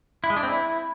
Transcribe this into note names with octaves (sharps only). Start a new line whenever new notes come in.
E4
G#3
D4
C4
E4